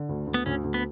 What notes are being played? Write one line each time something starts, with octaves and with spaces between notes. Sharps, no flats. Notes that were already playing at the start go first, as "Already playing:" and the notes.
Already playing: D3
D2
D2
B3
D2 C#4
D2
B3